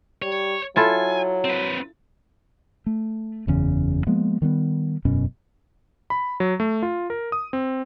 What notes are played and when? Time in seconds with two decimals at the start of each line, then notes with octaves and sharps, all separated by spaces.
0.22 G3 C#5
0.76 F#3 E4 F4 A4 G#5
1.45 C4 B4
2.86 A3
3.47 F#1 E2 C#3
4.07 F3 G#3 A#3 B3
4.42 D#3 G3 B3
5.05 E1 F#2 B2 C#4
6.10 B5
6.40 F#3
6.60 A3
6.83 F4
7.10 A#4
7.32 D#6
7.53 C4